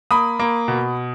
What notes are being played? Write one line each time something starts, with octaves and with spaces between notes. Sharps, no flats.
A#3 B5 D#6
A#3
B2